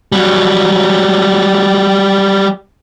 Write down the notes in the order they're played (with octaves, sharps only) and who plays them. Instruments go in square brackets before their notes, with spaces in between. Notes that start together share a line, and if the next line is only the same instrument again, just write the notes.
[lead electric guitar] F#3 G3